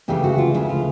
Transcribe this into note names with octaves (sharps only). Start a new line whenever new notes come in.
D2 C#3 E3 G4
F#4
F4
D2 C#3 E3 E4
F4